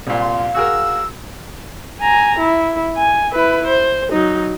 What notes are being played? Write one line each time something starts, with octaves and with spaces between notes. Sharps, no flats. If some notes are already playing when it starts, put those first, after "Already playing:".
C2 A#2 F5
C6
F#4 G#4 A#4 E6
G#5 A#5
E4
G#5
E4 B4
C5
F#3 D#4